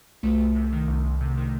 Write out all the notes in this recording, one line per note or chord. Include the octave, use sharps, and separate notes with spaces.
C2 A3
C2
C3
D#3
C2
C2
C3
D#3